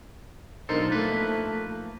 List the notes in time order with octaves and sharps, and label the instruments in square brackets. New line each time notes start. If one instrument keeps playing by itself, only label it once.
[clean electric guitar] B1 F4 A4 [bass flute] D4 [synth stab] D#4 A#4 C5
[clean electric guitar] F3 A#3 B4 [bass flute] A3